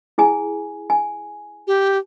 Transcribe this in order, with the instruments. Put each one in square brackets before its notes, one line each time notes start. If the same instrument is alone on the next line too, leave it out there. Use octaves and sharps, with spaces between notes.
[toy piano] E4 G#4 G#5
G#5
[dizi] G4